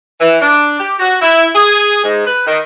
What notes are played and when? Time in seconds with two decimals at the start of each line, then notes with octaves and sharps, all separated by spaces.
0.20 E3
0.42 D4
0.79 G4
1.00 F#4
1.22 E4
1.55 G#4
2.04 G#2
2.26 B4
2.46 D#3